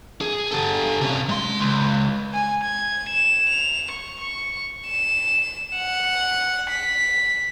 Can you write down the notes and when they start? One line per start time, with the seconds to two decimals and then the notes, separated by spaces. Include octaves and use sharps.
0.21 G#4
0.51 G4 A4
1.01 C3 C#4
1.29 G#3 C6
1.60 C#2
2.34 G#5
2.63 G#6
3.09 E7
3.49 F7
3.91 C#6
4.20 C#6
4.88 E7
5.75 F#5
6.70 B6